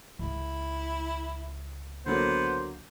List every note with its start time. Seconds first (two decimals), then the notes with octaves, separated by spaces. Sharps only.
0.19 C#2 E4
2.06 D3 F#3 A#3 B3 C5